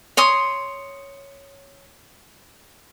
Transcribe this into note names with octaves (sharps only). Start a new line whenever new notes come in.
C#5 C6 D#6